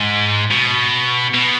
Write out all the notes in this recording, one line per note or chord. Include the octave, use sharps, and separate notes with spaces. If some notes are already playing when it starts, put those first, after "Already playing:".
Already playing: G#2
B2
B2